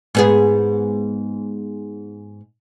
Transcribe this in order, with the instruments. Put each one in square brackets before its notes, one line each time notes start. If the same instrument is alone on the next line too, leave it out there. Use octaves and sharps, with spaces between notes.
[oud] G#2 B3 G#4